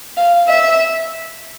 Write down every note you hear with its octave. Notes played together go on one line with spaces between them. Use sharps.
F5
E5